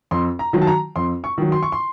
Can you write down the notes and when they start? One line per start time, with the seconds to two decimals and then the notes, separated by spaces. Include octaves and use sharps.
0.11 F2 C6
0.39 A#5
0.53 D#3 F#3
0.62 A5
0.67 A#5
0.96 F2 C6
1.24 C#6
1.38 D#3 F#3
1.52 C6
1.63 C#6
1.72 C6